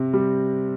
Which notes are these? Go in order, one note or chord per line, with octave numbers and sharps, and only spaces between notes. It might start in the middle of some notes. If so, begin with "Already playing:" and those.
Already playing: C3 C4
G3